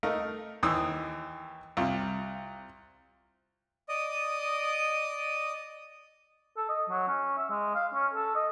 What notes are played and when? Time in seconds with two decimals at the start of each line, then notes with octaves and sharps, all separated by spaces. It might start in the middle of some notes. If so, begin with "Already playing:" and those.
0.03 A3 D#4 A#4 F5
0.63 D#2 E3 D#6 E6
1.77 C2 F4
3.89 D5 D#5 D#6
6.57 A4
6.69 D#5
6.90 F#3
7.08 C#4
7.38 E5
7.50 G#3
7.75 F5
7.94 C#4
8.14 A4
8.35 D#5